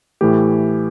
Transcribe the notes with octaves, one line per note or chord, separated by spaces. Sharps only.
A2 E3 A3 G4